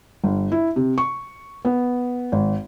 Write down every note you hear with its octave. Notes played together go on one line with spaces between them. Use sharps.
G1
E4
C3
C#6
B3
G#1